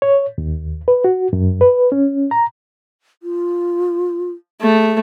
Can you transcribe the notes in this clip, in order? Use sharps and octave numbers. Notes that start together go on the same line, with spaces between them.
C#5
D#2
B4
F#4
F#2
B4
C#4
A#5
F4
A3 G#4